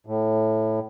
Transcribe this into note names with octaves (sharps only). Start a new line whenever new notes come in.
A2